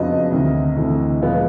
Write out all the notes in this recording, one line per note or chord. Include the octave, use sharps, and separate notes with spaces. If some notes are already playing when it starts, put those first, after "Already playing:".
Already playing: F2 C#3 F#3 B3 D4 D#5
D2 C3 D#3
D2 C3 E3 A3
A#2 F3 G#3 B3